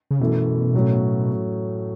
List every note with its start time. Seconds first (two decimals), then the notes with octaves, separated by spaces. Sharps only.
0.11 C#3
0.20 F#2 B2 E3 A3
0.74 A2 F#3 A3 C#4